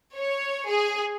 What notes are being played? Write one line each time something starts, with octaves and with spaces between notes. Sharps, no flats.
C#5
G#4